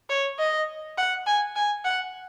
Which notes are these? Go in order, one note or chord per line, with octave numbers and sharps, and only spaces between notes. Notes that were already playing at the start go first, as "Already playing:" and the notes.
C#5
D#5
F#5
G#5
G#5
F#5